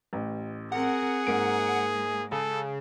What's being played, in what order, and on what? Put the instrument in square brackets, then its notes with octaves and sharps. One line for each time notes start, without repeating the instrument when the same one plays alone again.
[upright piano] A1
[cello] C4 A#4 [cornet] G#4 [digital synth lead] F#5
[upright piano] G#2 A#3 D7 [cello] G#3
[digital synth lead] C#3 [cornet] A4 [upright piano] G#5